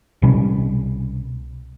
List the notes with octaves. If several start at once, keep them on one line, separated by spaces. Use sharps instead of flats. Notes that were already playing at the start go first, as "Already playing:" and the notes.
C2 B2 G3 C#4